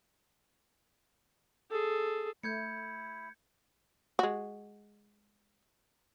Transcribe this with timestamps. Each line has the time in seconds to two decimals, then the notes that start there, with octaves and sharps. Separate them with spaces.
1.70 G#4 A4
2.43 A3 E4 G6 G#6 C#7
4.19 G#3 F#4